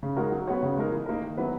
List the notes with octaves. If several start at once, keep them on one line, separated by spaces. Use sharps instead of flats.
C#3
G#3 D#4 F#4 A#4
F#3
B3 F#4 C#5
C#3
G#3 D#4 A#4
E3
A#3 D#4 A#4
D#3
F#3 B3 E4 B4